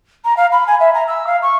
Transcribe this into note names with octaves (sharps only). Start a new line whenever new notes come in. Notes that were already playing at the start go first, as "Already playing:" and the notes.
A#5
F5
B5
G#5
E5
A#5
E6
F5
C#6